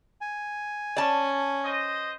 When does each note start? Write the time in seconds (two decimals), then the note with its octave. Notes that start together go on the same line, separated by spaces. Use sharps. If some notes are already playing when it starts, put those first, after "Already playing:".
0.21 G#5
0.97 C#4 D5 A5
1.65 C5 D#5